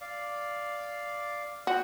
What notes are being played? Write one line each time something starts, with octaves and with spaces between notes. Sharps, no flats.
D5 F5
F#4 F#5 G5